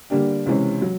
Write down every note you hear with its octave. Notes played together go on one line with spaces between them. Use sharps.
D3 G3 A#3 D4 G4
C#2 C3 E3 G#3 C#4
F#3